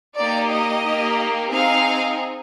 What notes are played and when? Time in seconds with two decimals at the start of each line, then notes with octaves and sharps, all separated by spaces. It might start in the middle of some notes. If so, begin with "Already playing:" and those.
0.17 A#3 D#4 G4 D5
0.51 D#5
0.85 A#3 D#4 G4
1.51 C4 D#4 G#4 F5